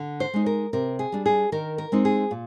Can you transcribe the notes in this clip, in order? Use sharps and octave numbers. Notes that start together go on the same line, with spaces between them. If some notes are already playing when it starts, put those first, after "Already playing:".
Already playing: D3
C5
G#3 D#4
A#4
C3 A#4
G#4
G3 D4
G#4
D#3 A#4
A#4
G#3 C4 D#4
G#4
A#2